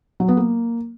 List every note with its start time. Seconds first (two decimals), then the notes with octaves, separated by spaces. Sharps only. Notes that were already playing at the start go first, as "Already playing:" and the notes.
0.20 F#3
0.28 B3
0.37 A#3